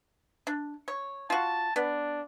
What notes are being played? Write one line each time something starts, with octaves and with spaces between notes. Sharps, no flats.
D4
C#5
F4 F#4 A5
B3 D4